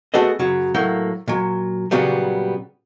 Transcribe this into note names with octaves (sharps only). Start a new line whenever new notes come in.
A3 B3 F#4 G#4 A4 D#5
F#2 C#3 F#3
A2 F#3 A#3 G5
A#2 F#3
A#2 C#3 F#3 G3 B3